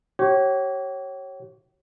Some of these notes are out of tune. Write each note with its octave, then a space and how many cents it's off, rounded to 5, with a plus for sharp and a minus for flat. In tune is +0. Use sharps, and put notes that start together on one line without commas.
G4 -40 C#5 -20